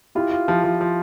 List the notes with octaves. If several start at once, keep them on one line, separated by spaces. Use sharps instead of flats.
E4 F4 G4
F4
F3 E4 G4
F3
F3